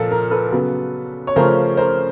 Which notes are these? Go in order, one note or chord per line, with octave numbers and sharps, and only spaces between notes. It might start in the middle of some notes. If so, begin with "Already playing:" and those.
Already playing: A#2 F3 A#3 A4 A#4
A#4
A4 B4
C#3 F#3 B3
C#5
C#3 F3 A3 C#4 A#4 C5
A#4 C5